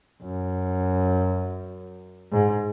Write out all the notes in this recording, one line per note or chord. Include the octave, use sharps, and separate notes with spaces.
F#2
G#2